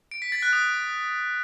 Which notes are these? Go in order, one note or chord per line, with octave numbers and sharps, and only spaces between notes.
D7
B6
A6
F#6
D#6